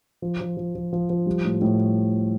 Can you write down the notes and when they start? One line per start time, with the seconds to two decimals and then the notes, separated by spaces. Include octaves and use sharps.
0.22 F3
0.40 F3
0.57 F3
0.75 F3
0.93 F3
1.10 F3
1.26 G3
1.44 A2
1.62 A2